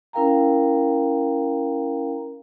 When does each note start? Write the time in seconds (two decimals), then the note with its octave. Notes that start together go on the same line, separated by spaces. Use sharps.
0.13 C#4 E4 A#4 F5 G5 A#5